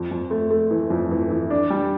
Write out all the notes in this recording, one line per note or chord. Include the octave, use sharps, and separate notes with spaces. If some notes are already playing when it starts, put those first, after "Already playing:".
Already playing: F2
F2
A3
A3
E3
F2
E3
E3
D4
G3